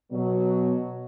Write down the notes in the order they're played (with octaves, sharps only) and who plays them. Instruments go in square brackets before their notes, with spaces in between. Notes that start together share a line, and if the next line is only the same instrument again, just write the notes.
[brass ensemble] B2 F#3